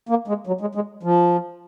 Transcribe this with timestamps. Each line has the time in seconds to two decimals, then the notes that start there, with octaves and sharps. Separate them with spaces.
0.09 A#3
0.28 G#3
0.47 F#3
0.61 G#3
0.75 G#3
1.03 F3